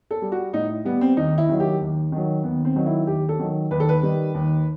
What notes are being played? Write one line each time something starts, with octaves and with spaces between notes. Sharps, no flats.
A4
G3
F#4
A2 D#4
G3 B3
C4
D#2 D#4
E4
D#3 F#3
G4
D#2
D#3 F#3
D#2 B3
C4
D#3 F#3
E4
D#2 G4
A4
D#3 F#3
D#2 B4
A4
B4
D#3 G3
D#2